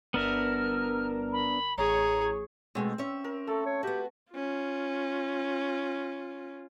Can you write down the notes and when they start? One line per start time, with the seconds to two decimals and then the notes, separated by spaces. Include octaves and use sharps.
0.14 G1 B3 D4 A#4 E5 F6
1.32 B5
1.77 A1 G#4 C#5 A#5
2.75 B2 G#3 A3 C4
2.98 C#4 E5
3.24 A#4
3.47 A3 A4
3.66 C#5
3.83 B3 F#4 G4
4.32 C#4 F4